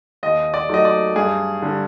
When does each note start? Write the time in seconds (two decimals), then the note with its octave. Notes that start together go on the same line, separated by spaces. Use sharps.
0.23 D#2 D#5
0.54 D5
0.69 D#3 F#3 A3 D#5
0.85 D5
1.16 G2 G#4
1.62 D3 G3